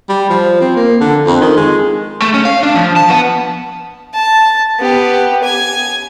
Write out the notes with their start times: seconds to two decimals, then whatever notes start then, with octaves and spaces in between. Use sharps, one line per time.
0.09 G3
0.30 F3
0.61 C4
0.77 A#3
1.00 D3
1.26 F2
1.41 D#3
1.56 G#3
2.22 A3
2.34 C#4
2.45 F5
2.63 D4
2.75 F3
2.96 A5
3.10 B3
4.14 A5
4.79 B3 G4
5.43 G#5